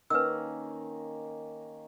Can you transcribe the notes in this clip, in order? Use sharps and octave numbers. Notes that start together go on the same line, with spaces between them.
D#3 A#3 C#4 B4 E6